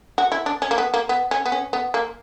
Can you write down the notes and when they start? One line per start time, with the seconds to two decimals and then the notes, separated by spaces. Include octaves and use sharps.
0.18 F#4
0.32 E4
0.46 D4
0.62 C#4
0.71 A#3
0.78 B3
0.94 A#3
1.09 B3
1.31 C#4
1.46 B3
1.52 C#4
1.73 B3
1.94 A#3